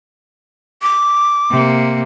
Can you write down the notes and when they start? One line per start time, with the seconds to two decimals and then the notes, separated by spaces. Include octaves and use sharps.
0.82 D6
1.50 C3 A#3